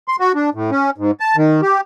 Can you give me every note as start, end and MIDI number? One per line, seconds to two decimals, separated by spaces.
0.08 0.16 84
0.20 0.32 66
0.35 0.50 62
0.54 0.71 45
0.71 0.90 61
0.98 1.11 44
1.20 1.36 81
1.37 1.61 51
1.62 1.81 67